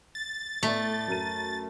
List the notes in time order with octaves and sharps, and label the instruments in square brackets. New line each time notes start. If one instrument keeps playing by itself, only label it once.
[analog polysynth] A6
[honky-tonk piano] A2 B3 D5 [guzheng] A3
[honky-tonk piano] F#2 A#4 D#7